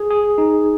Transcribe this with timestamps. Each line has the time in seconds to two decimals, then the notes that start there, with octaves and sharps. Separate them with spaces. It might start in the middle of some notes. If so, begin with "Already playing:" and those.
Already playing: G#4
0.10 G#4
0.38 D#4